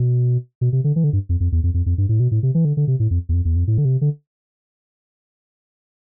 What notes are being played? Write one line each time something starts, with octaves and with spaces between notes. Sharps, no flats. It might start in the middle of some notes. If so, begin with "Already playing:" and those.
Already playing: B2
B2
C3
D3
E3
D3
G2
F2
F2
E2
F2
F2
F2
G2
A2
B2
A2
C3
E3
D3
D3
C3
A2
F2
E2
F2
E2
F2
A2
D3
C3
D3